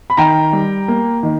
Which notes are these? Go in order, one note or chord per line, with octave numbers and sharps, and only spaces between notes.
B5
D#3 G5 A#5
G3
A#3
D#3